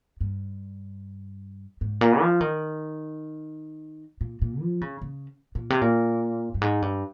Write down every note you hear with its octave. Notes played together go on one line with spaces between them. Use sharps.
G2
G#2
A#2
F3
D#3
A#2
A#2
F3
C#3
C#3
A#2
C3
A#2
G2
G#2
G2